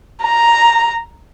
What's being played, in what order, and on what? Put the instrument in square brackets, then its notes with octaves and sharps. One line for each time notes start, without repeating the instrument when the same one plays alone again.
[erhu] A#5